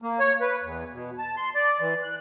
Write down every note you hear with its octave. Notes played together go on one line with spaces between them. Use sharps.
A#3
C#5
B4
E2
B2
A5
C6
D5
E3
F#6